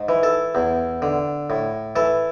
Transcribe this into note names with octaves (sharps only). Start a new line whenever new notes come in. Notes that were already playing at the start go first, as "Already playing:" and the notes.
Already playing: G#2
E3
A4
E2
D3
A2
E3 A4